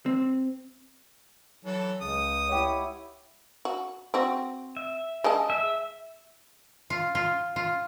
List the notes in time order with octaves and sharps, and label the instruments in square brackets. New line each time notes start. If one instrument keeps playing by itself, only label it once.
[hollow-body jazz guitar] C4
[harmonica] E3 A4 [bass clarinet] F#3
[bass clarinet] C#2 [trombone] C#3 [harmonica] D#6
[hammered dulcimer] E4 G4 F#5 [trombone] C#5
[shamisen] F#4
C4 F#4
[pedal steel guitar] E5
[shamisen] G#3 D#5 A5
[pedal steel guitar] E5
[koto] F4
F4
F4